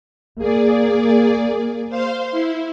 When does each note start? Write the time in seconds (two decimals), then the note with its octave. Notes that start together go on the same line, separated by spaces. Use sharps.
0.38 A#3 G#4 D5
1.89 C5 F5 C6
2.31 E4